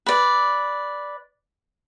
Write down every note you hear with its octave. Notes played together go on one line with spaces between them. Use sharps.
B4 D5